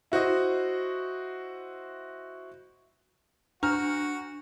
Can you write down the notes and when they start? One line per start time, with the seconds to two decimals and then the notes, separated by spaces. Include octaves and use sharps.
0.12 E4 F#4 C5 D#5
3.63 D4 F#4 A#5 F6